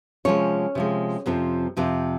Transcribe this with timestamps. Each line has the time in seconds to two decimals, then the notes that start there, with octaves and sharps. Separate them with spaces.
0.25 C3 F3 G#3 C#4 C#5
0.75 C3 F3 G#3
1.26 F2 C3 F3
1.77 F2 C3 F3